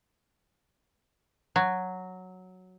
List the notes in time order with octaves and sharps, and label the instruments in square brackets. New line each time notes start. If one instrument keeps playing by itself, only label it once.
[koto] F#3